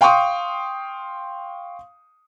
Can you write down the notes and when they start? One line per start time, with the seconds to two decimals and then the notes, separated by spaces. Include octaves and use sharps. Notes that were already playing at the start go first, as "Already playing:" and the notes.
0.01 F5 G5 C6 C#6 D#6